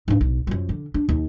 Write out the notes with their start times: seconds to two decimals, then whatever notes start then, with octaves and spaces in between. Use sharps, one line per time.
0.08 G#2 D4
0.21 B1
0.47 F#2 F3
0.69 D3
0.94 D4
1.09 D#2